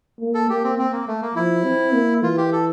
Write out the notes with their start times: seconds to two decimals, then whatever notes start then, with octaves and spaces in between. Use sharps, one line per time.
0.20 A#3
0.34 A4
0.49 A#3 G4
0.64 C4
0.79 C4
0.92 A#3
1.08 A3
1.22 A#3
1.35 F3 E4
1.65 C4
1.94 A#3
2.23 E3 F4
2.37 G4
2.52 A4